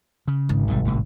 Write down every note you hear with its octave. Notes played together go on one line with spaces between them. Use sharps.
C#3
G#1
B1 C3 G3
C2 A2 C3